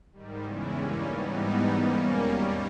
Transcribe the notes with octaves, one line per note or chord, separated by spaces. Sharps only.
G#2 D#3 G3
E2 C#3 E3 G#3 C#4 E4
G2 G3 A#3 C#4
G#2 E3 G3 B3 D#4
G#2 E3 G3
G#2 G3 A#3 C#4
E2 B2 G3
D#2 D#3 G3